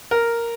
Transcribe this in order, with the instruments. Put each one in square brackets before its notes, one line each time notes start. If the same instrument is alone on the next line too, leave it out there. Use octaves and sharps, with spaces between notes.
[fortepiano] A#4